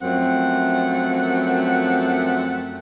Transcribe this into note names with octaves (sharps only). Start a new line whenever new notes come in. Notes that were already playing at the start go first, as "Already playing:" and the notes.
F#2 F3 A3 C4 F#5